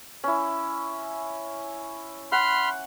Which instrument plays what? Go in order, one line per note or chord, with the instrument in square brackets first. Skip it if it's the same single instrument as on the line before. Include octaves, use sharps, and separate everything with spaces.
[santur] C#4 E4
[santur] F#5 [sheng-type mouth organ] B5 C6 F6